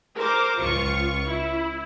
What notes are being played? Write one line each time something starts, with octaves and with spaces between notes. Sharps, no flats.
A#4 C5 D6
C#2 F4 C#6 C#7
E4